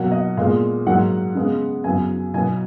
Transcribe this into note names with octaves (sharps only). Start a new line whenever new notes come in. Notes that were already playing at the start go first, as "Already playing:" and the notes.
Already playing: B2 F#3 A#3 F#5
D#5
A#2 G#3 B3 F5
G#2 F#3 A#3 F#5
C#3 G#3 B3
F#2 C#3 F#3 B3 G#5
B2 F#3 B3 G#5